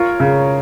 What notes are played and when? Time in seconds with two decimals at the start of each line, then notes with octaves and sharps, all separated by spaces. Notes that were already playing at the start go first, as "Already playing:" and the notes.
Already playing: F4 A#4 C#5
0.20 C#3